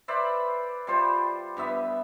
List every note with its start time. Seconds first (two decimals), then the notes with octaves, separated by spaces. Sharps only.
0.08 B4 C5 D5 E5
0.87 G3 F4 C5 G5
1.57 G2 B3 E5